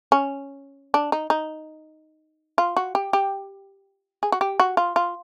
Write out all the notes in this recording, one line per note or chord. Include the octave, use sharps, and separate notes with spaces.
C#4
D4
D#4
D#4
F4
F#4
G4
G4
G#4
F#4
G4
F#4
F4
F4